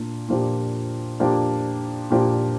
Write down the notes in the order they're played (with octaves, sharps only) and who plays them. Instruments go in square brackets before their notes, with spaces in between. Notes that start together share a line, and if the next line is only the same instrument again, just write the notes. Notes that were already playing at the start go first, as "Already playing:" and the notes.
Already playing: [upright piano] A#2 A#3 D4
A#2 F3 A#3 D4 G4
A#2 F3 A#3 D4 G4
A#2 F3 A#3 D4 G4